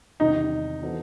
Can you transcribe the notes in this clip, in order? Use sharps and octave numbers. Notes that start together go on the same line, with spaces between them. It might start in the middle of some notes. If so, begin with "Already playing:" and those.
E2 C3 D#3 G3 D#4
E3 B3 F#4 A4 C5